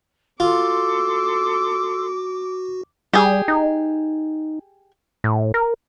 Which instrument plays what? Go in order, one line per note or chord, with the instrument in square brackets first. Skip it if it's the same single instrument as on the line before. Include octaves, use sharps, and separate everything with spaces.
[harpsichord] F4 [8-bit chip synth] F#4 [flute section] A4 C6 E6 [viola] D6
[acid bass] G3 [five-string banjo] G4 G#4
[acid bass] D#4
A2
A#4